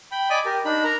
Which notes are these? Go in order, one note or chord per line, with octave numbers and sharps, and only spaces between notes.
G5 B5
D5 D#5 G#5 B5 D6
G4 A#4
D4 D#4 B5
A#4 A#5